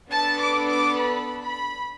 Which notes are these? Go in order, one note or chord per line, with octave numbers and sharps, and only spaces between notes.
B3 D4 A4 A5
D6
D6
B5
B5